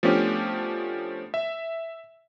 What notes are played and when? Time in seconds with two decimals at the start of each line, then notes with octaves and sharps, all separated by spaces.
0.03 F3 A3 B3 C#4 D4 G4
1.34 E5